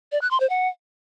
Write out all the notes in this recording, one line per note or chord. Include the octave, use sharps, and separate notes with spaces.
D5
F#6
C6
C5
F#5